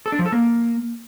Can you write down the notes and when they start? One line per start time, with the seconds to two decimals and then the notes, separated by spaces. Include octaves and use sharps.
0.06 A4
0.12 D4
0.19 F3
0.26 A4
0.32 A#3